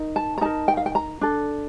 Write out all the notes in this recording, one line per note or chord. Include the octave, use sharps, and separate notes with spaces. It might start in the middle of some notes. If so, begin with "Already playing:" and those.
Already playing: D#4 A#4
A5
A#5
D#4 A#4 A5
G5
F5
G5
A#5
D4 A4